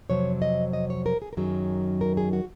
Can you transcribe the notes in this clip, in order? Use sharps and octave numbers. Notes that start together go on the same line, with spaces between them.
F2 C3 F#3 C#5
D#5
D#5
C#5
A#4
G#4
A#4
F#2 D#3 F#3 G#4
A#4
G#4
F#4